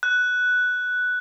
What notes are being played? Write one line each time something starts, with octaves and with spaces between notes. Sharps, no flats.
F#6